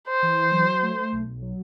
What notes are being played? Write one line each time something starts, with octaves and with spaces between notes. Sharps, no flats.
C5
E3
F#3
A3
B1
F#3